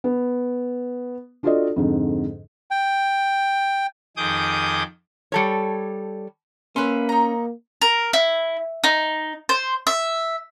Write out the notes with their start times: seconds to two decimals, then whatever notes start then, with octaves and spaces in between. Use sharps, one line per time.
0.04 B3
1.43 D4 F4 F#4 A4 D5 D#5
1.76 F2 G#2 D3
2.71 G5
4.17 F2 D#3 G#4 D6 D#6 G6
5.32 G3 A4 C#5
6.76 A#3 C#4 B4 E5 C6
7.09 D#4 A#5
7.82 A#4
8.13 E4
8.84 D#4
9.49 C5
9.87 E5